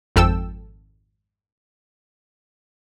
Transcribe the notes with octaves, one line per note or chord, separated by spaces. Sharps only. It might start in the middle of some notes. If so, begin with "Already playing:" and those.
G#1 F2 A4 G5 E6